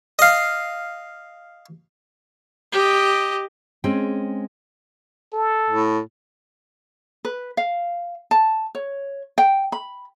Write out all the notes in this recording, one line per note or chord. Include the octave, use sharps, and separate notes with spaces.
D#5 F5
G4 D#5
G#3 C4 C#4 G5
A4
A2
B4
F5
A5
C#5
G5
B5